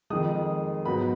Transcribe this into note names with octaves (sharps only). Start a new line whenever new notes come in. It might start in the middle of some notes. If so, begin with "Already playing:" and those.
F2 D#3 G#3 D#6
G#2 F#3 B3 B5